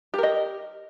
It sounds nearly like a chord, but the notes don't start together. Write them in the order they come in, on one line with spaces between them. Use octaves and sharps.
G4 A#4 D#5